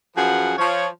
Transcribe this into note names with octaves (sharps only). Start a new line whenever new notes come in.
F#2 F3 F#4 G#4 B4 F#5
F3 C#5